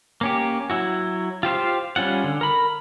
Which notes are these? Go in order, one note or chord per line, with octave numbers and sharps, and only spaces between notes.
A#3 C#4 G4
F#3 E4 F#4
F4 G4 C5 F5
G3 C#4 F4 F#5
D3
A#4 B5